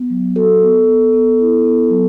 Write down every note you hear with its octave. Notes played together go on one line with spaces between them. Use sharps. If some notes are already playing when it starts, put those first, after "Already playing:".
Already playing: B3
F#3
F#4 A4
B3
B3
B3
E4
B3
F#3